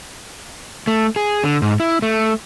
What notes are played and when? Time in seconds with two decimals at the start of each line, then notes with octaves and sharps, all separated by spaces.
0.87 A3
1.16 G#4
1.44 D3
1.62 G#2
1.80 E4
2.02 A3